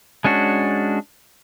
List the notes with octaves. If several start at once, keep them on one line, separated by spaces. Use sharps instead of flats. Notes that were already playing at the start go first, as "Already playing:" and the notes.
G#3 C#4 D4 F#4